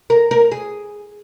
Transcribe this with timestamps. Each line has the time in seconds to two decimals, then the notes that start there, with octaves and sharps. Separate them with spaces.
0.10 A#4
0.31 A#4
0.52 G#4